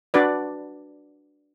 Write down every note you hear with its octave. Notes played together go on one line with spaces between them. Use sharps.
D4 F#4 B4 D5